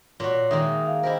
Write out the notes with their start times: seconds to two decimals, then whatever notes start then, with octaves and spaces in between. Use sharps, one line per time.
0.20 A#2 F#4 C#5
0.51 D#3 G#3 A#3 E5 D#6
0.87 F5
1.03 E4 G4 A#4 C5 D#5